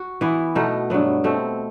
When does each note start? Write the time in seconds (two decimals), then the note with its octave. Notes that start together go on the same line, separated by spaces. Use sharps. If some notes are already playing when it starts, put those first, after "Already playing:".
Already playing: F#4
0.21 E3 B3 E4
0.55 B2 A3 D#4
0.90 G2 F#3 B3
1.24 B2 A3 C4